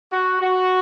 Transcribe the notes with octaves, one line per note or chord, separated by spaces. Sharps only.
F#4
F#4